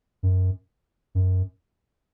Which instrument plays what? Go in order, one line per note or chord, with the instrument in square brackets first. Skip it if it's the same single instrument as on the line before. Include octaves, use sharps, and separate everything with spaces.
[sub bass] F#2
F#2